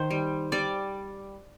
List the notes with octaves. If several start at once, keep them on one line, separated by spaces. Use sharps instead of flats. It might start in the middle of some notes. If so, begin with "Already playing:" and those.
Already playing: D#3 C5
G3
G3 D5